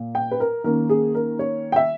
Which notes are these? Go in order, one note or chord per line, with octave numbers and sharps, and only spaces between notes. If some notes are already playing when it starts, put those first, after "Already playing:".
Already playing: A#2
G5
B4
A#4
D#3 A#3 C#4 A#4
G#4
A#4
C#5
G5
E5